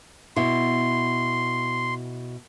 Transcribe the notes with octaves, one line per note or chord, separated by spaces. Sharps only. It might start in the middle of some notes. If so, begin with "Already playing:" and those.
B2 E4 C6